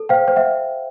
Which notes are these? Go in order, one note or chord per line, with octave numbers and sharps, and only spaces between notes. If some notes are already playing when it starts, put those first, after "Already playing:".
Already playing: A4
C5 F5 G5
C5
E5 F#5